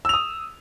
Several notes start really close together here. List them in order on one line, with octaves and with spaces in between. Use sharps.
E6 F7 D#6